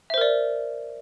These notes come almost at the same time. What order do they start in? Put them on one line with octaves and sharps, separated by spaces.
E5 C5 A#4 D5